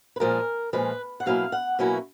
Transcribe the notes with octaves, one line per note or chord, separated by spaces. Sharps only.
B4
A#2 F3 G#3 A#4
A#2 F3 G#3 B4
F#5
B2 F#3 A#3 C#4 E4 F5
F#5
B2 F#3 A#3 C#4 E4